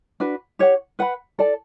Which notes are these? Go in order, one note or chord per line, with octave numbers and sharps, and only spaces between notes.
D4 F#4 B4
G4 C#5 F#5
B4 F#5 B5
A4 D5 A5